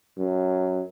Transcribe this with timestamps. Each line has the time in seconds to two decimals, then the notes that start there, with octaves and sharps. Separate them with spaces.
0.17 F#2